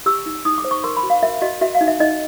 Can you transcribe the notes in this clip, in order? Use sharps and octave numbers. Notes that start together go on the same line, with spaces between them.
G4 E6
D#4
D#4 D#6
D6
C5
C#6
A#4 C6
B5
F#4
F5
A#4 E5
F#4 D#5
F#4 E5
F5
D#4
E5
D#4 D#5